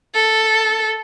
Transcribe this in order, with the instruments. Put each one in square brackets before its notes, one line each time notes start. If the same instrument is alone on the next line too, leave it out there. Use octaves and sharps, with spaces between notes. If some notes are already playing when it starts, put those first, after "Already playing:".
[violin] A4